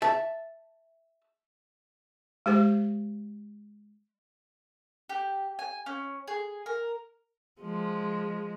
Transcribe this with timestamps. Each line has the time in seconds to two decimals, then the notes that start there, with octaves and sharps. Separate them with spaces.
0.02 E5 A5
2.46 G#3 G4 C5
5.09 G4
5.59 G#5
5.86 C#4
6.28 G#4
6.66 A#4
7.62 F3 G#3